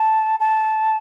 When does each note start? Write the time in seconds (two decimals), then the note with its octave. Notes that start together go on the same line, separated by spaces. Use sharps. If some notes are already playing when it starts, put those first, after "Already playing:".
Already playing: A5
0.40 A5